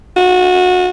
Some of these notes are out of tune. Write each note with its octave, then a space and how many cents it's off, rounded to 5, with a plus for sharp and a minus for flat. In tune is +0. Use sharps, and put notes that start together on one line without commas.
F#4 -25